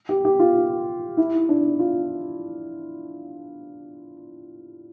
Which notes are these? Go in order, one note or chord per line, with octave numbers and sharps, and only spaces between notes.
G4
G4
F4
E4
D4
F4